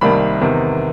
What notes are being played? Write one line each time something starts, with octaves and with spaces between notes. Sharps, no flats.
C2 C3 D#3 G3 A#3 B5
E2 C3 D#3